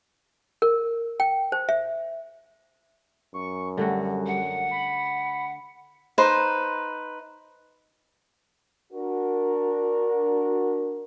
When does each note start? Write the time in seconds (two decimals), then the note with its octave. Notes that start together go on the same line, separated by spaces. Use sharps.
0.62 A#4
1.20 G5
1.52 C5
1.69 E5
3.34 F#2 C#6
3.77 D3 G3 A3 F#4
4.27 F#5
4.71 B5
6.18 D#4 B4 C5
8.93 D4 F#4 A#4